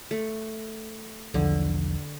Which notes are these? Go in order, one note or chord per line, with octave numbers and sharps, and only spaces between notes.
A3
B1 E2 D3 F3